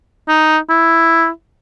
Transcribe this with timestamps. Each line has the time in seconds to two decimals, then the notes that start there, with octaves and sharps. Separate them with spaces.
0.28 D#4
0.70 E4